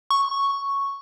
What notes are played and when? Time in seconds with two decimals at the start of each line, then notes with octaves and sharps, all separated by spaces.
0.10 C#6